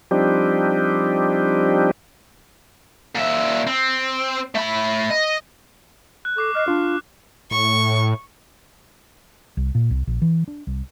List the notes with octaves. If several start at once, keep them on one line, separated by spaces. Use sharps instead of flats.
F3 G3 C4 D4 D#4 G4
A#2 E5
C4
A3 B5
D#5
F#6
A4 C#6 D6 C7
D#5 F6 F#6 C7
D4 F4
A2 C#6
C2
A#2
C2
A#1
E3
D4
C2